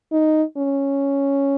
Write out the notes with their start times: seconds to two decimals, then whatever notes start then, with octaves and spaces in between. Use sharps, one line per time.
0.12 D#4
0.57 C#4